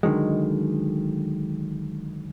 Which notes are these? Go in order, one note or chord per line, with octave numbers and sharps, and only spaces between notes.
D3 D#3 F#3 G#3